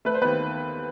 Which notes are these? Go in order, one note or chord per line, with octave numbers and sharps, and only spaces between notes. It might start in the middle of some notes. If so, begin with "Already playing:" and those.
A3 B4
C5
D#2 B3 B4